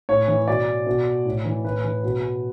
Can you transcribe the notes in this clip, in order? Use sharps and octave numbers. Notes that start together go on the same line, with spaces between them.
A2 C#5
E3
B2 D5
B2
A2
E3
A2 B4
E3
B2